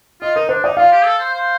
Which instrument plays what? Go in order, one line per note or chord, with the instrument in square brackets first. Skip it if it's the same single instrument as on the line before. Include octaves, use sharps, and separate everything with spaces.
[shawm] F4 [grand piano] D#5
[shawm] D#4 [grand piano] A#4
[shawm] D4 [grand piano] C5
[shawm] D#4 [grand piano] D5
[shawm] F4 [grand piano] F5
[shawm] G4
A4
C5
C5